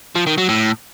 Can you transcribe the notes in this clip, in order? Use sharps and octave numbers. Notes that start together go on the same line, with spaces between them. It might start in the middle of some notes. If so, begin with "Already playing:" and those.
F3
D#3
F#3
A2